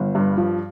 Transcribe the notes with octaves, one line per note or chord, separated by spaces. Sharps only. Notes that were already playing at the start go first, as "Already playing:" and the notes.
Already playing: G1
G2
F3